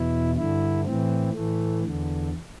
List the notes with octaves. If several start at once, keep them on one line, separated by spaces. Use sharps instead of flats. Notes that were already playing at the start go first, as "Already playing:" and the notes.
Already playing: E2 B2 E4
G2 D3 E4
A2 E3 C4
A2 E3 A3
E2 D3